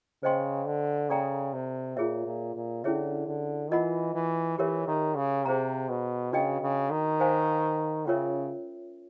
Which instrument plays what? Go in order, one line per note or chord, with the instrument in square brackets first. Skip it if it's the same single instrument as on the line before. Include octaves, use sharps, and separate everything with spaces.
[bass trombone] C#3 [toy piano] C5 D#5 G5 C6
[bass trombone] D3
[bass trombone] C#3 [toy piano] A4 D5 G5 A#5
[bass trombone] C3
[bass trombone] A#2 [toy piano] F4 G#4 C#5 E5
[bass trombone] A#2
A#2
[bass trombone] D3 [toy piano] C#4 E4 G#4 C#5 E5
[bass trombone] D3
[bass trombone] E3 [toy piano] F4 A#4 D#5 F#5 B5
[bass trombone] E3
[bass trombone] E3 [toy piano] G4 A#4 C#5 E5
[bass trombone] D#3
C#3
[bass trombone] C3 [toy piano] G#4 C5 F5 A#5
[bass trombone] B2
[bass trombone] C#3 [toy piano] D4 F#4 B4 D#5 G5
[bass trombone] C#3
D#3
[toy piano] C5 F5 G#5
[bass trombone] C#3 [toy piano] C#4 F4 A#4 C#5 E5